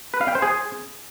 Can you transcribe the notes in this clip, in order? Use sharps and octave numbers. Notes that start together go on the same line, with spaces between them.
B4
F5
G5
C5
G#4